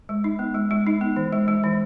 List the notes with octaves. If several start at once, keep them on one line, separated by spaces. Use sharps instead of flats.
G#3
D#4
B3
G#3
G#3
D#4
B3
E3
G#3
G#3
E3